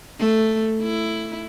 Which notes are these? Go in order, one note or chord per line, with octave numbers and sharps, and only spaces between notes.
A3
E4